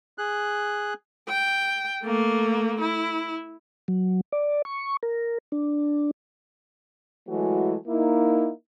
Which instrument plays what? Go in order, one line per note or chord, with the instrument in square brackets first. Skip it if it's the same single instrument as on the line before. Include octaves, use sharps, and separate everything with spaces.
[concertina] G#4 F#6
[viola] G5
A3 A#3
E4
[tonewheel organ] F#3
D5
C#6
A#4
D4
[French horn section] E3 F#3 G#3 A3 E4 F#4
A#3 D#4 E4